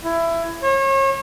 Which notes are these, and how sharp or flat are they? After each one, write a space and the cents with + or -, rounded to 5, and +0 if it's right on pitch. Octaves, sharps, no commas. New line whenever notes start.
E4 +20
C#5 -35